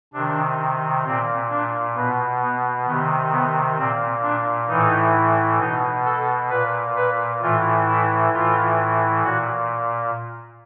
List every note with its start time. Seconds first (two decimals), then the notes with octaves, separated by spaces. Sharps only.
0.14 C3 D#3 D4
1.05 A#2 C4
1.50 D4
1.95 B2 B3
2.41 B3
2.87 C3 D#3 B3
3.31 B3
3.78 A#2 C4
4.22 D4
4.68 A2 E3 D#4
5.59 B2 D#4
6.04 A4
6.50 A#2 B4
6.96 B4
7.41 A2 E3 F4
7.87 E4
8.33 A2 E3 F4
9.23 A#2 F#4